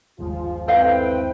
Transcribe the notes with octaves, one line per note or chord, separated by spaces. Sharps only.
G1 D#2 F3 G#3 F4
C4 E4 A4 B4 D#5 F5 G5